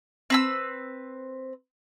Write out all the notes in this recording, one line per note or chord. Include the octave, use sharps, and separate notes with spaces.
C4 B4 E6